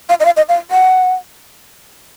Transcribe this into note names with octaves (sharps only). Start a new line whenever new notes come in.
F5
D#5
F5
D#5
F5
F#5